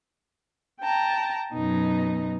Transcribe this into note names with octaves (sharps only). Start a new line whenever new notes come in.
G5 A5 A#5
F#2 B2 D#4